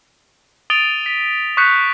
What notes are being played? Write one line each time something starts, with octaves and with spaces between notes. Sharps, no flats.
D#6 A6 D7 D#7 F7 G7
B6
C#6 D#6 F#6 G6 B6 C#7